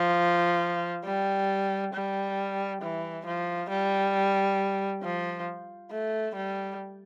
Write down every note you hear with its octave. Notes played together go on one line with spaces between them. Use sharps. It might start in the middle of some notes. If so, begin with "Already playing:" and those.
Already playing: F3
G3
G3
E3
F3
G3
F3
A3
G3